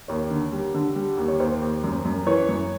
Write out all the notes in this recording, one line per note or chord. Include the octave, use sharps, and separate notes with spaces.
D#2 C#5
D3
G3
D3
G3
D#2
C#5
D#2 C5
D#2
F#2
F#2
E3 C#5
F#2